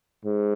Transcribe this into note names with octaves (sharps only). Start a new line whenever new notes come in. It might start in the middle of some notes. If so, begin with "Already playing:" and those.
G#2